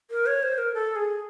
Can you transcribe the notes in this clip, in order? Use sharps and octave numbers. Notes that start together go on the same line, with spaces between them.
A#4
C#5
C5
A#4
A4
G#4